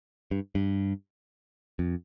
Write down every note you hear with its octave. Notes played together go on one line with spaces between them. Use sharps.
G2
G2
F2